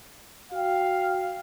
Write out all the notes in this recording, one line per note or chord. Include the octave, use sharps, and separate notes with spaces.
F#4 F5 G5